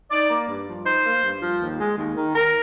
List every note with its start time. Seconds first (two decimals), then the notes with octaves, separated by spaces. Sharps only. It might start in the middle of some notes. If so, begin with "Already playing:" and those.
0.11 D#4 D5
0.30 A#3
0.48 G2
0.67 F3
0.85 D#4 C5
1.04 A#3
1.23 G2
1.42 F3
1.60 D#2
1.79 G#3
1.97 D#2
2.16 D#3
2.34 D#2 A#4